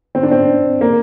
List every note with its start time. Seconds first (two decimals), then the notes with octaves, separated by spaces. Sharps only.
0.15 C4
0.23 D4
0.31 C4
0.81 A#3